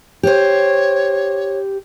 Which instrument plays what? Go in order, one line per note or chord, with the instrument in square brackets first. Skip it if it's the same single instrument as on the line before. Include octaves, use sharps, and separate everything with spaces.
[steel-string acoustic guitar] G4 C5 [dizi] C#5